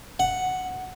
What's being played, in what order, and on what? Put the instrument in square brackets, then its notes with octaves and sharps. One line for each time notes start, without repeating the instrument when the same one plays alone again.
[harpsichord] F#5